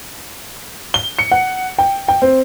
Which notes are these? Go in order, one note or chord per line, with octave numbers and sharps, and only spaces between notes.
G7
C#7
F#5
G5
G5
C4